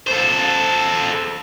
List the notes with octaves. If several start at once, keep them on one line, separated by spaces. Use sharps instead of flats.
A4 C5